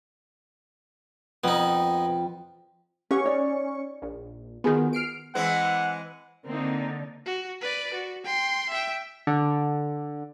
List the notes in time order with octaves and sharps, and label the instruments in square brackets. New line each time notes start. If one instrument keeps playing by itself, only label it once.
[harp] F2 [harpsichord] B3 D#4
[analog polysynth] C#4 C#6 [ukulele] G4 B4 F#5
[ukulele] D#4 C#5 D5
[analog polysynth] A#1
[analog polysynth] D#3 B3 [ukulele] F4 F#4 G#4
[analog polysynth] F6 C7 D7
[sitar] E3 G#3 C4 [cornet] F#5
[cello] D3 [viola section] A#3 C4 D#4
[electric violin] F#4
B4 D5
F#4
G5 C6
E5 G5
[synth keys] D3